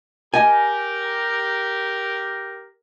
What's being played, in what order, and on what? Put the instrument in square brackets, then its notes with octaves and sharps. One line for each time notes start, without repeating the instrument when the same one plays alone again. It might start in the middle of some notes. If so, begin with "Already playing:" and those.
[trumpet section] G4 A#4 [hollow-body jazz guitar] D#5 G#5